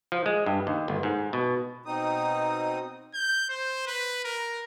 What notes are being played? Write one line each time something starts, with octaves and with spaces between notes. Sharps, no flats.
F3
G#3
G2
D#2
G1
G#2
B2
B2 C4 D#4 D#6
G6
C5
B4
A#4